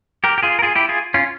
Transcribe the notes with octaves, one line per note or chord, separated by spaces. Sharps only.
G4 A#4
G4
F4 G#4
A#4
F4 G#4
E4 G4
F4 G#4
C#4 F4